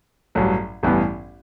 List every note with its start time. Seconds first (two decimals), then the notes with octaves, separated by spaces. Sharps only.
0.35 A1 G2 F#3
0.83 A1 G2 E3 B3